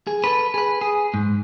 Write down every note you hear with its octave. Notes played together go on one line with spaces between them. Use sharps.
G#4
A4 B4
G#4 B4
G#4
G#2